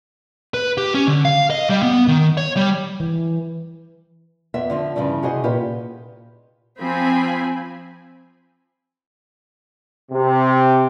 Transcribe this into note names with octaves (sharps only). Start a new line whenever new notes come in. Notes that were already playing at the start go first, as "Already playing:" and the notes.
B4
G4
C#4
D3
F5
D#5
G3
B3
D#3
C#5
G3
E3
F2 B3 E5
D3 F3 C4
G2 C#3 E3 F3
C3 F#4 G#4 C5 D#5
A#2 F4 G4 B4
F3 C4 G#5 B5
C3